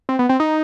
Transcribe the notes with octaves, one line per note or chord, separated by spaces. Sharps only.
C4
B3
C4
D#4